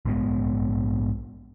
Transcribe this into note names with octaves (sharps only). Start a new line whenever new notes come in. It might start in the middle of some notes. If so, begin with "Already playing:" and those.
A#1 G#2 G#3 B3